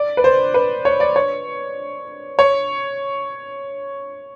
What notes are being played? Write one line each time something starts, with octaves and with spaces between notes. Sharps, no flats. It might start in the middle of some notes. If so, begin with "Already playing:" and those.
Already playing: D5
B4
C5
B4
C#5
D5
C#5
C#5